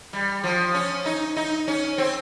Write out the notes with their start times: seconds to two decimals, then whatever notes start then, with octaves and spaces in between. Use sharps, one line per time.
0.13 G3
0.44 F3
0.74 C#4
1.06 D#4
1.37 D#4
1.68 C#4
1.98 C4